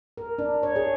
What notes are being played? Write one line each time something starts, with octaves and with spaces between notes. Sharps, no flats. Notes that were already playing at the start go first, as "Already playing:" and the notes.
A#4
D4
C#5
G#4